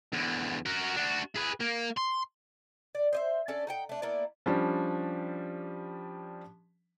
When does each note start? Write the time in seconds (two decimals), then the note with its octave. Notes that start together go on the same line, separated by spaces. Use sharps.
0.13 E2 D3
0.66 F#4 A#4
0.96 D4 F#4
1.36 G#4 B4
1.60 A#3
1.97 C6
2.95 D5
3.13 C5 D#5 E5
3.48 C#4 D4 A4 D5
3.67 D#4 F#5 G5
3.89 A3 D4
4.02 A#3 B3 E4 D5
4.46 F3 G3 C#4 D4